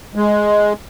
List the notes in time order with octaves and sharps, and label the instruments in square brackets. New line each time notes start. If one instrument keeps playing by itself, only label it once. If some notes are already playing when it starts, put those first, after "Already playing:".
[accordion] G#3